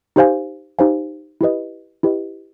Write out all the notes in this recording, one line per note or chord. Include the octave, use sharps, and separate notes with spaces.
D#4 G4 C5 F5 G#5
D#4 G4 C5 F5 G#5
E4 G4 B4 D#5
E4 G4 B4 D#5